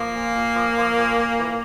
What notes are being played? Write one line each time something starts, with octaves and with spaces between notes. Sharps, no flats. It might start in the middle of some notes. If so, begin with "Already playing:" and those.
Already playing: F3 A#3
A#2
A#2
F3
F3
A#2
A#2
E3